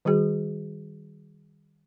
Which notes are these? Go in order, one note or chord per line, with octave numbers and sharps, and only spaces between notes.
D#3 G3 F#4 G#4